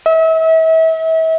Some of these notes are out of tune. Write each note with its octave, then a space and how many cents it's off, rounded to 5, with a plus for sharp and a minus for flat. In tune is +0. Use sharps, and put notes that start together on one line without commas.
E5 -35